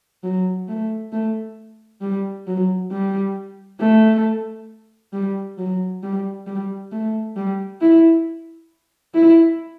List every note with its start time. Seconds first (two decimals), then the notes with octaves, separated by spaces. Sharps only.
0.23 F#3
0.68 A3
1.12 A3
2.01 G3
2.47 F#3
2.91 G3
3.80 A3
5.13 G3
5.58 F#3
6.03 G3
6.47 G3
6.92 A3
7.36 G3
7.81 E4
9.14 E4